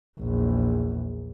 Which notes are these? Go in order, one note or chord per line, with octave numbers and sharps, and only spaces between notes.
A#1 E2